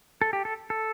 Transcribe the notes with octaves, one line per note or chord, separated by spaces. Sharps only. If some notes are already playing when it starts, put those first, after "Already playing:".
A4
G4
A4
A4